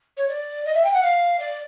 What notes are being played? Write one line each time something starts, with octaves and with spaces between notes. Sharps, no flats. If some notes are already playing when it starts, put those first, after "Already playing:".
C#5
D5
D#5
E5
G5
F#5
F5
D5